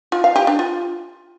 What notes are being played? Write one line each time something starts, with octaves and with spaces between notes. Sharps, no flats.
F4
F5
G4
D4
F4